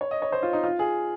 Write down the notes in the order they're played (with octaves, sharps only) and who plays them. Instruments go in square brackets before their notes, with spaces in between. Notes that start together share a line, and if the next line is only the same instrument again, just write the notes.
[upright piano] C#5
D#5
C#5
C5
F4
D#4
F4
G#4